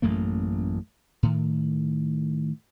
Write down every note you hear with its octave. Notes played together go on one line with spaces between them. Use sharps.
A1 F#2 A3 A#3
A2 D#3